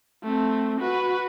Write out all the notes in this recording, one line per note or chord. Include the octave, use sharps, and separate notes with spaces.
A3 C4
F#4 B4